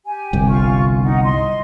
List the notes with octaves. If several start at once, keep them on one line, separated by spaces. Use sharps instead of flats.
G4 G#5
G1 C2
F4 C#6
D#4 F#5
D#5 C6